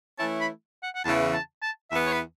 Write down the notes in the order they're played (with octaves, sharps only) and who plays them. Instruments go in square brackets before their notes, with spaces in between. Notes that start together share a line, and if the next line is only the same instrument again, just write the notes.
[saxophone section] E3 A3 C#4 E4 [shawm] A5
[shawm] B5
F#5
F#5
[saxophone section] E2 C#3 E3 [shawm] A5
[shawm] A5
A5
[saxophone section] E2 E3 B3 [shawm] E5
[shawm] C#5
B4